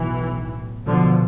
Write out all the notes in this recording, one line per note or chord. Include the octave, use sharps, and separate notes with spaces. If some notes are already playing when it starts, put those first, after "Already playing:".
Already playing: B1 A2 E3
B1 B2 D3 F3